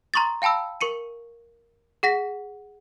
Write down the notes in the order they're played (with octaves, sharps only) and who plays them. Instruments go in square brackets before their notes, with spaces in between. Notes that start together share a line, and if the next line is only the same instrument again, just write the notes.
[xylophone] A#5 C6 C#6 D#6 A6
F5 G5 A5 B5 E6
A#4 C#6 C#7 D#7
G#4 F#5 A#6 B6